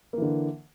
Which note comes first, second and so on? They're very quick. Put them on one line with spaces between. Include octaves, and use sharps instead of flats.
A#3 E3 D3